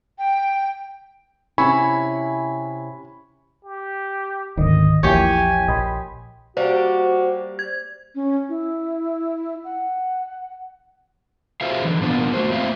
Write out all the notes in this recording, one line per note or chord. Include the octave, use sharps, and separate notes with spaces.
G5
C3 C#4 E4 G#5 B5 C#6
G4
D1 G#2 D3 D#3 D#5
A#1 E2 F3 A#3 E4 G4 C#5 G#5
A#1 D#5 B5 C6
G3 A#3 F#4 G4 C5
G#6
C#4
E4
F#5
F4 F#4 G#4 C5 E5 F5
D3 E3
A#2 A#3 B3 D4 F4
A3 F#4 C5
A#3 C4 F4 C5 E5 F5